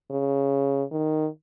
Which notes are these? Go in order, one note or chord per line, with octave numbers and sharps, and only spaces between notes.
C#3
D#3